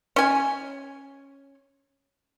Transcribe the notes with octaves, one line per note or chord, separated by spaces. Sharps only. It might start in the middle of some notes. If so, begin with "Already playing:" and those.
C#4 G#5